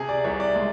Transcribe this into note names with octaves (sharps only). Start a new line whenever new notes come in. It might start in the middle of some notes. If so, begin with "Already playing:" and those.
Already playing: C3 G#4
D5
C2 C#5
D5
G#3